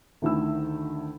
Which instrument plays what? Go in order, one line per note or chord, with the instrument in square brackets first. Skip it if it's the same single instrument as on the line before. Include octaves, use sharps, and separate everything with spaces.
[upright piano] D2 D3 D#3 A3 E4 E6